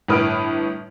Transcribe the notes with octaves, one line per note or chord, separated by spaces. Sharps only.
G1 A2 B4 D#6 F6 D7